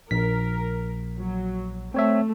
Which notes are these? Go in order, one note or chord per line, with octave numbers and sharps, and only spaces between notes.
A#1 A#4 B6
F#3
A3 C4 C#5 E5